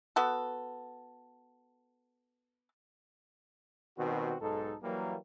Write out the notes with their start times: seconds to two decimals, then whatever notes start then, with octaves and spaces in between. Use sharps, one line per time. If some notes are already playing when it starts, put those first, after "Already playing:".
0.16 B3 F#4 A4
3.98 B2 D#3 G3 C4 F#4
4.41 B1 G#2 D#4 A4
4.82 E3 F#3 G3 A#3